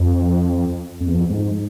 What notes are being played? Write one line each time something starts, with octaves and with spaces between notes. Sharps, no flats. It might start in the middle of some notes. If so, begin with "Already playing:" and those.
Already playing: F2
F2
E2
F2
G#2